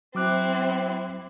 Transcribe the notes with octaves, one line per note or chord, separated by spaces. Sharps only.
F#3 C4 E4 D6 F#6